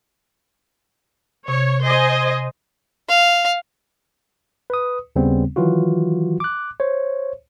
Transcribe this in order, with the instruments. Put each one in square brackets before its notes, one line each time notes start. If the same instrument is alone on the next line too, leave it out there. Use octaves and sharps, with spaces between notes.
[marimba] C3 [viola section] C#5
[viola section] C5 D#5 G#5
[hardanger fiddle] F5
[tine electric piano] B4 D#6
D#2 C#3 G3 B3 C4
D#3 E3 F#3 F4 F#4
D6 F#6
C5 C#5